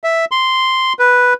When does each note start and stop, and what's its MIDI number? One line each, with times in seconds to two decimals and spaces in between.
0.04 0.25 76
0.31 0.93 84
0.99 1.34 71